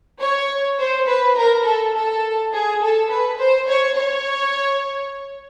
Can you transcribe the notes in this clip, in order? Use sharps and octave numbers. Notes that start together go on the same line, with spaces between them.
C#5
C5
B4
A#4
A4
A4
G#4
A4
B4
C5
C#5
C#5